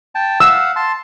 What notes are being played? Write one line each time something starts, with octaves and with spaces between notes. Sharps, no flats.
G5 A5
F5 F#5 E6
A5 C6